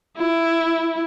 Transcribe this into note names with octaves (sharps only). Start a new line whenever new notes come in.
E4